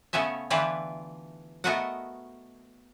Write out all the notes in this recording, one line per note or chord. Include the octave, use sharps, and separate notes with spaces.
C#3 A3 B3 C#4 E5
D3 E3 E4 F4 G4 B4
A3 B3 F#4 A#4 D#5 F#5